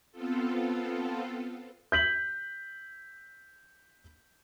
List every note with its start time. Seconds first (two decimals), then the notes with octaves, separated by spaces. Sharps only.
0.12 B3 C4 F4 A4
1.92 G6 B6 F#7